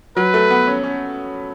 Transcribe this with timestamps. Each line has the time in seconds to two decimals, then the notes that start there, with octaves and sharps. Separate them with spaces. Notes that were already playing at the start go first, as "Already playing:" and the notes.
0.17 F#3 B4
0.34 A3
0.51 B3
0.67 C#4
0.83 C#4